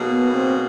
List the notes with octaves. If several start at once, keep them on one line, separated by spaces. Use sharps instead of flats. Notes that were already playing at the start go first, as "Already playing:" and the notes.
Already playing: B2 F#3 A#3 D#4 G#4
B3
C4